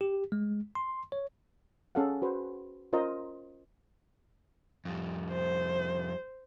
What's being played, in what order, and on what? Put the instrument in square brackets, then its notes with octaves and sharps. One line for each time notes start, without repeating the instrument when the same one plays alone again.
[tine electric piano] G4
G#3
C6
C#5
[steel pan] C#4 G#4 A4 F5 F#5
F#4 B4 C5
C#4 F4 A#4 C5 D#5 A#5
[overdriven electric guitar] F2 G3
[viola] C5